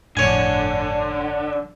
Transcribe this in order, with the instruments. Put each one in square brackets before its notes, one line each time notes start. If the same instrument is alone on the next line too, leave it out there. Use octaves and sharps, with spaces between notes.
[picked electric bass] G1 F2 A2 [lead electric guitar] D3 [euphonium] D4 [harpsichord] C#5 G#5